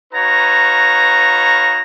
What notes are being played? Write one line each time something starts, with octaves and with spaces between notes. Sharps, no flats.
D#4 F#4 B4 C#5 F5 A#5